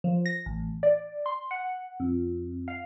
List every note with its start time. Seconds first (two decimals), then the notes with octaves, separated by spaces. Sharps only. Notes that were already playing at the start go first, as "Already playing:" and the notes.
0.04 F3
0.26 A#6
0.46 A1
0.83 D5
1.26 C6
1.51 F#5
2.00 F2
2.68 F5